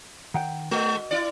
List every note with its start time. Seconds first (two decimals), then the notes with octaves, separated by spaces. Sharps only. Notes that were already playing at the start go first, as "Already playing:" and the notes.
0.34 D#3 F#5 G5
0.71 G#3 F#4 D#5
1.11 E4 D5